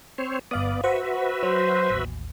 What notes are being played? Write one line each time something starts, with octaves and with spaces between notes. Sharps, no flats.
C4 C5 C#5
G1 B3 D5 F5 D#6
F#4 B4 C5 E5 F#5 C#6
F#3 C5
A1 D#2